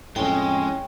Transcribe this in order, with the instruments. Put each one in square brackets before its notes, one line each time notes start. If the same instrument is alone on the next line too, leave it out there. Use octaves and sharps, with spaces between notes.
[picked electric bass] F2 A2 [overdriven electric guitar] G#3 [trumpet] C#4 [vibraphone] G5